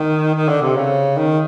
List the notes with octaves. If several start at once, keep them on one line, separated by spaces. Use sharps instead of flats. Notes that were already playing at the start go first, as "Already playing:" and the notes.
Already playing: D#3
D#3
D3
C3
C#3
D#3